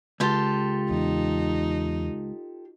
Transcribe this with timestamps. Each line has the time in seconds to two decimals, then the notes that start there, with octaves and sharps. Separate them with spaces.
0.20 C#2 F4 G4 A4
0.91 E2 D#4